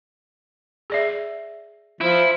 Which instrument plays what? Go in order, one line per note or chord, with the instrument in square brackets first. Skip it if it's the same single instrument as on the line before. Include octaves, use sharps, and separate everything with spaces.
[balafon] G#4 D5 E5
[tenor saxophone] F3 [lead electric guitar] E4